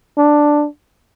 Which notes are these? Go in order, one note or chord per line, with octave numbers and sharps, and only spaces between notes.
D4